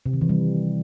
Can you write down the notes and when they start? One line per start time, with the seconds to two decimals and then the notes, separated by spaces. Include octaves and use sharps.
0.06 C3
0.13 D#3
0.21 E3
0.29 G3